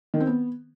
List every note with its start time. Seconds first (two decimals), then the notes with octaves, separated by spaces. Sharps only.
0.14 D#3
0.20 C4
0.27 B3